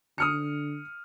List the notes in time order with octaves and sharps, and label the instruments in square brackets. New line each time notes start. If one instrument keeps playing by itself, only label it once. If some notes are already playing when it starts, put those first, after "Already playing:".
[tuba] D3 [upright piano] D#6 F6 C#7